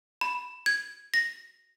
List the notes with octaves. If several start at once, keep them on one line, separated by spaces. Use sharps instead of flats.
B5
G#6
A#6